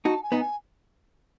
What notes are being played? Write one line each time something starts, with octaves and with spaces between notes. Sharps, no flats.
D#4 F#4 A5
G#5
B3 D#4
G#5